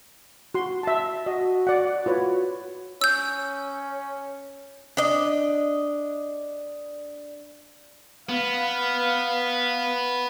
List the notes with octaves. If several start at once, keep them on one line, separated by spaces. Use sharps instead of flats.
F#4 C6
E5 A5
F#4 D#5
D5 F#5
F4 F#4 B4 C#5
C#4 E6 G6
D4 D#5
B3 F5